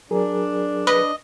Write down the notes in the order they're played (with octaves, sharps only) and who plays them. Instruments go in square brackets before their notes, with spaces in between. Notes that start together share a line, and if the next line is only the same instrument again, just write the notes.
[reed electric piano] F#3 G#4 A#4 [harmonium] D4
[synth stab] B4 [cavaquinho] D#5